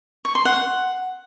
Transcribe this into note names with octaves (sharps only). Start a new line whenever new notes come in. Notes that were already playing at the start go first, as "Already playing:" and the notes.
C#6
C6
F#5